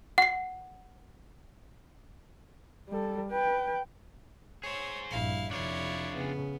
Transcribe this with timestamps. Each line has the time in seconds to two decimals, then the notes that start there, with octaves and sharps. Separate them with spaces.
0.18 F#5 C7
2.89 G3 A4
3.31 B4 G5
4.64 G#4 C5 C#5
5.10 A#1 G2 E4 F5
5.51 F2 C3 D4 E4 F4 C#5
6.14 C#3 B3